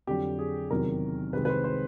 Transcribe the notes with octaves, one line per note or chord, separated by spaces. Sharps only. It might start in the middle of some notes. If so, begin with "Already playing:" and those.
F2 D3 F#3 G4
G#4
E2 C3 D#3 F#3 A#4
C2 C3 D#3 G#3 B4
B4
C5
C5